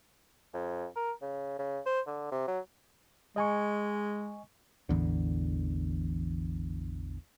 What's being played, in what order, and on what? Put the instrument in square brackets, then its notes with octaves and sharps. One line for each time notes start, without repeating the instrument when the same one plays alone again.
[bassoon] F2
A#4
C#3
C#3
C5
D3
C3
F#3
[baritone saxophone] G#3 [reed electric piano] D#5 G#5 C#6
[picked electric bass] A1 E2 D3